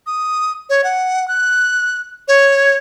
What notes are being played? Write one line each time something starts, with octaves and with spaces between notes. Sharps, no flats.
D#6
C#5
F#5
F#6
C#5